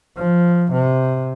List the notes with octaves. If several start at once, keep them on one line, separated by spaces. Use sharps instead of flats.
F3
C3